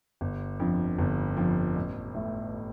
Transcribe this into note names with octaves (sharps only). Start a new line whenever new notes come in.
G1
F2 D3 F3
G1
F2 D3 F3
A1
A2 A3